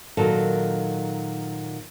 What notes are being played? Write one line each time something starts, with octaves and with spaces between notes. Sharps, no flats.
A#2 D#3 F#3 A4